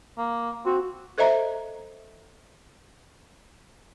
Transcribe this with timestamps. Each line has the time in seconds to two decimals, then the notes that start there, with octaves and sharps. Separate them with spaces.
0.18 A#3
0.66 C4 F#4
1.18 A4 C5 D#5 E5 A#5